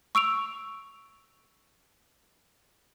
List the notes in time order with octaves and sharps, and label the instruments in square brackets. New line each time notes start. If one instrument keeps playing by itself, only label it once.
[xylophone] C#6 E6 D7 F7